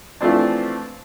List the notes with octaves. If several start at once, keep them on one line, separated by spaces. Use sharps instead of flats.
E3 F3 A3 C4 D4